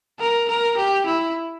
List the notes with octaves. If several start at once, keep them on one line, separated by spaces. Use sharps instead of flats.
A#4
A#4
G4
E4